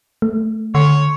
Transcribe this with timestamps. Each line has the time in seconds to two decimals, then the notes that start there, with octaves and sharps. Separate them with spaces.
0.22 A3
0.75 D3 C#5 C6